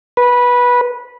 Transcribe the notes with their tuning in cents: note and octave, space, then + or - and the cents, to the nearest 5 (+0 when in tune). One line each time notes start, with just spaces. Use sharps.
B4 -15